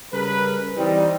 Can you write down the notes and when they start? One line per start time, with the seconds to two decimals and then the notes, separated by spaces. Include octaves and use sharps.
0.12 C#3 G3 G#4 A#4 B4
0.77 E3 G3 C4 D#4